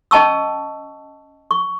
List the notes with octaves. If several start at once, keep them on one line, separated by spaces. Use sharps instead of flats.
C#4 D#5 G5 A5 C#6 E6
C#6